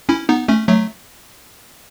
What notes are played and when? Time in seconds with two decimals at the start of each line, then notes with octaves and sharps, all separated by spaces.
0.09 C#4 E4
0.29 B3 D#4
0.48 A3 C#4
0.68 F#3 A3